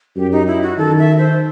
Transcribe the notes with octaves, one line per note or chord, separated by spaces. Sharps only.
F#2 G4
D#4
E4
F#4
D#3 A4
E5
C5